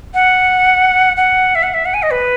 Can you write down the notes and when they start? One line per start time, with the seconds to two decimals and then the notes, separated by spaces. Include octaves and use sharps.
0.14 F#5
1.17 F#5
1.55 E5
1.63 F#5
1.74 E5
1.85 F#5
1.94 G#5
2.02 D#5
2.11 B4